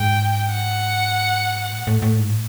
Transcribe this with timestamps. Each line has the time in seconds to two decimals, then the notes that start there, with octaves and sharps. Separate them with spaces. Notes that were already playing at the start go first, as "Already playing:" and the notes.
Already playing: G#2 G5
0.53 F#5
1.73 A2
1.87 A2
2.02 A2
2.18 G#2
2.32 A2